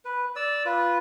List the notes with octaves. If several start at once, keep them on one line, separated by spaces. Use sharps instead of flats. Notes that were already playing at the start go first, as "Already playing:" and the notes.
B4
D5 E6
F4 B4